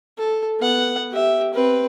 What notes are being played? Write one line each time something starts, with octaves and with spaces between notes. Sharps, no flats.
A4
B3 F#5
G4 E5
C4 B4